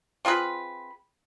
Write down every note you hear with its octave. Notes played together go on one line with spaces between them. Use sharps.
C4 F4 G#4 B4